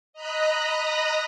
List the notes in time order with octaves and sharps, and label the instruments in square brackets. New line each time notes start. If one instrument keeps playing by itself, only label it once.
[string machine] D#5 A#5 B5 D#6 F#6 A#6